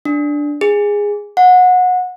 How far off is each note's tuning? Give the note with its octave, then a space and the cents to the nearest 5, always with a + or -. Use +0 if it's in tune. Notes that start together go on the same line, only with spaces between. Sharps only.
D4 +0
G#4 -10
F#5 -25